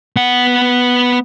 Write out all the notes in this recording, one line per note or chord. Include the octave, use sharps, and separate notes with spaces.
B3 F#5